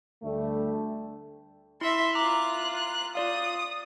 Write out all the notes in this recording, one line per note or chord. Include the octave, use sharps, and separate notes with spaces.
D2 G3 A3
E4 E5 C6
F4 A#5 D6 F#6
F4 D5 F5 D#6